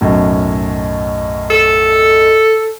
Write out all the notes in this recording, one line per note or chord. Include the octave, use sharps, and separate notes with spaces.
B1 F#2 A2
A4